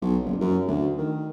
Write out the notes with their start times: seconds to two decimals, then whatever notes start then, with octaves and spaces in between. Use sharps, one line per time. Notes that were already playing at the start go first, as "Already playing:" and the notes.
0.02 B1
0.25 F#1
0.41 F#2
0.67 D2
0.98 D#3